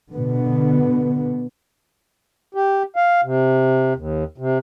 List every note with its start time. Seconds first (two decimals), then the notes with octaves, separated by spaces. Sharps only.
0.11 B2 D3 B3
2.55 G4
2.96 F5
3.24 C3
3.96 D#2
4.38 C3